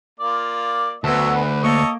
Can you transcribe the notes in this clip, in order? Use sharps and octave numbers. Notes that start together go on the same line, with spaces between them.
A#3 F4 D5
D2 F#3 B3 E5 A5
B4
A#3 A4 C#5 D#5